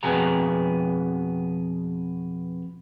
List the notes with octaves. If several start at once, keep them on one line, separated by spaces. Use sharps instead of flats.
F2 B2 B3 G#4 A#5